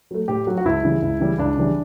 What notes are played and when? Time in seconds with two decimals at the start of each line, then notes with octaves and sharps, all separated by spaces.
0.11 F#3 A3
0.28 A2 G4
0.47 F#3 A3 F#4
0.58 F#4
0.65 C#2 E4
0.84 C#3 E3 G3
1.02 C#2
1.20 C#3 E3 G3
1.38 C#2 D4
1.57 C#3 E3 G3